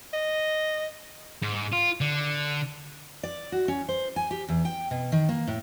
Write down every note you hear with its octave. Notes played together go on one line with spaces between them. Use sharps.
D#5
G#2
F4
D3
D5
F#4
C#4
C5
G#5
G4
E2
G5
B2
D#3
A#3
A2